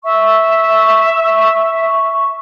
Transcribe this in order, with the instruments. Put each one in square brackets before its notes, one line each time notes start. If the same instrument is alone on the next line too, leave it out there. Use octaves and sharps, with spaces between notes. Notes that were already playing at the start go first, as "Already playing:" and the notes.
[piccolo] E5 [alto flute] C#6